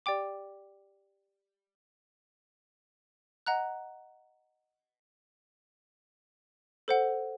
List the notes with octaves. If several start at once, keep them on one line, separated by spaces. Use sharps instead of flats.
G4 D5 G5 D6
D#5 F#5 A#5 F#6
A4 C5 F#5